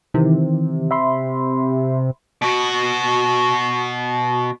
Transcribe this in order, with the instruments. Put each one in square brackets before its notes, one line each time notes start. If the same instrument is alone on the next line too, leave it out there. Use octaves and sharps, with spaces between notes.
[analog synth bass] C3 [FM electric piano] D#3 E3
[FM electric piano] E5 B5 C6
[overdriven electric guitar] B2 F#4